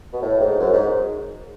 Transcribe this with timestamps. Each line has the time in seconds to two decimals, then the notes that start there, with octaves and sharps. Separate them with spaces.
0.13 B2
0.22 A2
0.40 G#2
0.60 F#2
0.73 G#2